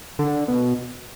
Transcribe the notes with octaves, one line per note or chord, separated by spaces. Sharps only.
D3
B2